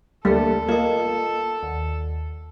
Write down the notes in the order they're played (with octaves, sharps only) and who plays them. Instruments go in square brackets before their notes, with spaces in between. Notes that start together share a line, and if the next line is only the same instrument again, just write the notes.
[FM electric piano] D2 A#3 [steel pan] G3 A3 [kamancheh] A4
[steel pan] A#3 [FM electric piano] F4 D#5
[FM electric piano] D#2